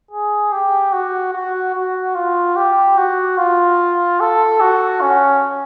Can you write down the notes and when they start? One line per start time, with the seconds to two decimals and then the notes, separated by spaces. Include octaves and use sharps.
0.11 G#4
0.52 G4
0.92 F#4
1.33 F#4
1.75 F#4
2.15 F4
2.56 G4
2.98 F#4
3.37 F4
4.20 A4
4.60 F#4
5.01 C#4